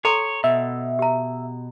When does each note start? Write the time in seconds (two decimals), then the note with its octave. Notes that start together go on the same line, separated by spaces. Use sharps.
0.05 A4 C#5 A#5 C6
0.44 B2 E5
0.99 G4 A#5